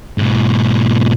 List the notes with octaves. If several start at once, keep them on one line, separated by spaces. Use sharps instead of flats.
G#2 B2